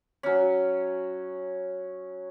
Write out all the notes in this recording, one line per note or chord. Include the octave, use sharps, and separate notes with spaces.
F#3 C#4